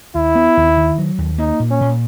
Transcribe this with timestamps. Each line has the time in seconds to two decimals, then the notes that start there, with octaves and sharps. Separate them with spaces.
0.15 D#2 E4
0.35 B3
0.57 D#2
0.77 D#3
0.98 F#3
1.18 D#2
1.38 A#3 D#4
1.60 A#2
1.71 C#4
1.81 A#2